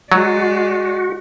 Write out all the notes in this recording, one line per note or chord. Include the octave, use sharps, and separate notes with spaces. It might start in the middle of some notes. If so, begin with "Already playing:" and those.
F#3 G#3 F#4 D5